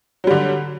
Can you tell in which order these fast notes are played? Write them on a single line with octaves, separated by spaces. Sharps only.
F#3 G3 D3